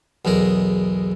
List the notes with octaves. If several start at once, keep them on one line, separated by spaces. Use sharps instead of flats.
B1 E2 G#3 A#4